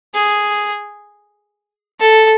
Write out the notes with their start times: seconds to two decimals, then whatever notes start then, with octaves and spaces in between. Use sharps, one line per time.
0.14 G#4
1.99 A4